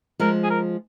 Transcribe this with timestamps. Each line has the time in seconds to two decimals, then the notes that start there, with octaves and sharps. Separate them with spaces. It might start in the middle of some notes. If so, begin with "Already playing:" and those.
0.20 F3 G#3 A#4
0.44 G#4
0.50 A#4